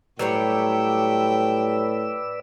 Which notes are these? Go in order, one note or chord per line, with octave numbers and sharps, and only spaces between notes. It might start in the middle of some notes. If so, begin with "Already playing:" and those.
A2 F#3 G3 B4 C#5 D5 G5 E6